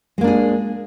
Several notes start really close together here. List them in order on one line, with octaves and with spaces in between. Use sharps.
G#3 A#3 D4 G#4